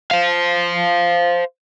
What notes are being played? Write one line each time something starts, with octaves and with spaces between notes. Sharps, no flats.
C5 F5